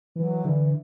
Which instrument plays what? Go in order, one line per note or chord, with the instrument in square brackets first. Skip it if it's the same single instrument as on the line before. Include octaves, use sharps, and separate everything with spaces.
[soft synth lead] E3 [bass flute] F#3
[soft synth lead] D3 [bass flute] E3